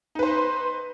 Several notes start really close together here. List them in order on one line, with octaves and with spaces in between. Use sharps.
D#4 B4 C5